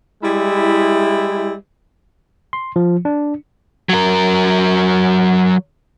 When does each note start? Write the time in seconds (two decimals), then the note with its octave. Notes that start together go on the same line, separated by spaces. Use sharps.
0.22 G3 G#3 E4
2.53 C6
2.76 F3
3.05 D4
3.89 F#3 A#4